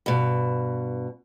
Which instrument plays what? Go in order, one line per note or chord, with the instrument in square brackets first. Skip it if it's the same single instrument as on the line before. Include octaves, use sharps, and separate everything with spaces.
[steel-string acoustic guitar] G2 B2